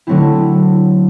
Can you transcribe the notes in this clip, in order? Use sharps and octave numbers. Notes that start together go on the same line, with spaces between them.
D3 F#3 A3 C4 E4